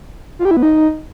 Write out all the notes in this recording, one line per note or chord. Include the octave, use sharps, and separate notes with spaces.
F4
G4
E4
B3
D#4